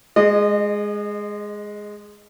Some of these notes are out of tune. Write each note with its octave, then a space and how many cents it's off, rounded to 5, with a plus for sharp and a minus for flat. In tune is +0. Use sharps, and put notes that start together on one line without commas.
G#3 +0 D#5 -30